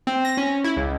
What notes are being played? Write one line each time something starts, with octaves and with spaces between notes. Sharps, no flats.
C4
A#6
C#4
E4
C#2